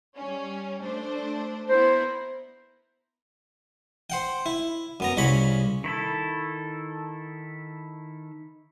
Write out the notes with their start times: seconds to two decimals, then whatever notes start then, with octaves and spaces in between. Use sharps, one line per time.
0.16 G3 C#4
0.81 A3 D4 C5
1.69 B3 E4 A#4 C5
4.10 C5 F#5 G5
4.46 E4
5.00 F#2 B3 A#5
5.17 C2 C#3 C#5 B5
5.84 D#3 E4 A4